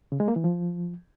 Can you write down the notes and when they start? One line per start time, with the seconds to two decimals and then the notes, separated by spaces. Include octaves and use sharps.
0.12 C#3
0.20 G#3
0.28 A#3
0.36 E3
0.44 F3